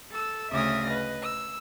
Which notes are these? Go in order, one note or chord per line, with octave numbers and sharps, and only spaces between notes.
A4 E6
D2 C#3 E5 D#6 F6 A#6
B4 D#5
E6